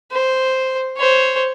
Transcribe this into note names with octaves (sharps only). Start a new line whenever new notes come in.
C5
C5 C#5